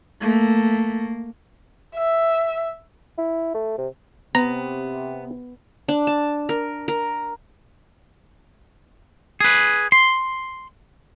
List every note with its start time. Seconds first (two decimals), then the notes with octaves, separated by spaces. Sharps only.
0.20 A3 A#3
1.96 E5
3.18 E4
3.55 A3
3.78 C3
4.35 C3 B3 A#5
5.88 D4
6.07 A5
6.49 A#4
6.88 A#4
9.40 G#4 B4
9.92 C6